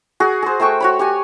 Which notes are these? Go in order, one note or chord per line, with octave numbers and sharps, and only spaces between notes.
F#4 G#4
G#4 C5
A3 C5 G5 C#6
F#4 C#5 B5
G4 C#5 G#5